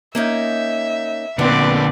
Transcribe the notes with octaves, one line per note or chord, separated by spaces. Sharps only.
A#3 C#4 D#4 E5
A#2 D3 B3 C4 B4 D5